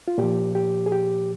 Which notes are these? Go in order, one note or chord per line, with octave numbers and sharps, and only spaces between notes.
F4
A#2 F3 G4
G4
G#4
G4